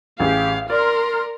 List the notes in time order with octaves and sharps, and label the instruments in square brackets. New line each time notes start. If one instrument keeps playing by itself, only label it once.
[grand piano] A1 G#4 [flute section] G4 [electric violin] F5
[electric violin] A#4 [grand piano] D5 [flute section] A#5 C6 F6